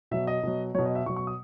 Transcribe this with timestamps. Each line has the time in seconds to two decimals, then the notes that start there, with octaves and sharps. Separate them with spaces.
0.11 B2 F#3 E5
0.27 D#5
0.43 B2 F#3
0.74 F#3 C#5
0.79 B2
0.85 D#5
0.95 E5
1.06 B2 C#6
1.10 F#3
1.16 C#6
1.27 D#6